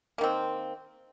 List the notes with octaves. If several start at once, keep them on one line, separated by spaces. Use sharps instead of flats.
D#3 A#3 C4